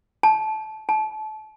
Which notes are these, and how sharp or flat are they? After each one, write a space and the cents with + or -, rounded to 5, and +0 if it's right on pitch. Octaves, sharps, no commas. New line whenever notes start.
A5 -20
A5 -30